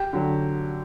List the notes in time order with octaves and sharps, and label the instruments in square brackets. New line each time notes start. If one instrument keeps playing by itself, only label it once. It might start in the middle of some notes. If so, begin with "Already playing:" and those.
Already playing: [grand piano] G4
D3 F#3